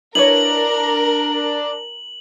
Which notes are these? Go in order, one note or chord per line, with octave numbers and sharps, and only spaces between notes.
D4 E4 A#4 B4 C#5 F#7